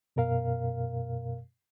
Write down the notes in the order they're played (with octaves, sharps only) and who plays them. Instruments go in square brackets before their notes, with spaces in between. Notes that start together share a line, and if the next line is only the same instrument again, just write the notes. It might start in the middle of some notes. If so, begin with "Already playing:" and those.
[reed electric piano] F#2 B2 A#4 F5